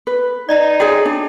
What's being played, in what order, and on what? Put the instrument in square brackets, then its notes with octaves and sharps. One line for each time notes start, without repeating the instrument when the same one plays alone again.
[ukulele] B4
[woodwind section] D#4 [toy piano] D5 D#5 A#5
[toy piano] F#4 C#5 G5 [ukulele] G#4 D5
[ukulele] D4